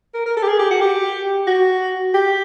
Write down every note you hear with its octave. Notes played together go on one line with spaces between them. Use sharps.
A#4
A#4
A4
G4
G#4
G4
F#4
G4
F#4
G4